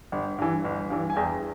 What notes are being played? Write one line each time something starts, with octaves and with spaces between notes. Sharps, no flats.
G1
G2 E3
G1
G2 E3
G#5
E2 G5